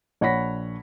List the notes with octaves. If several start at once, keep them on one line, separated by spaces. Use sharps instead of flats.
A#1 C#5 F#5 B5 A#6 B6